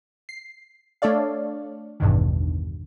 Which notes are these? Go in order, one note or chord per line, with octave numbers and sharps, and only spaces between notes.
C7
A3 D4 A4 C#5 D5 F5
A1 E2 G2 B2 D3 D#3